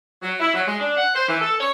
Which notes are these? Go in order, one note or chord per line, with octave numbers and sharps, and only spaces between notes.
F#3
E4
F#3
G#3
D4
F#5
C5
E3
A4
C#5